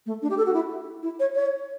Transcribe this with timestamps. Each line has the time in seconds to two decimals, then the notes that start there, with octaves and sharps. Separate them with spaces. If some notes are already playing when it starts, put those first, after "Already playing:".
0.06 A3
0.22 D4
0.30 G4
0.38 A4
0.46 F#4
0.54 E4
1.03 E4
1.20 C#5
1.35 C#5